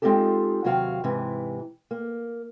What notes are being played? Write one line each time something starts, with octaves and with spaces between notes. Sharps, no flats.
G#3 C4 D#4 F4 G4 A4
D#2 C3 F#3 F#4 F5 G5
G#2 C3 E3
A#3